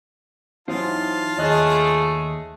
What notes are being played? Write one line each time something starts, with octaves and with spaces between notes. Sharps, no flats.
E3 F#3 D#4 F4 C5 F5 A5
D#2 A3 G#4 C#5 D#5 F#6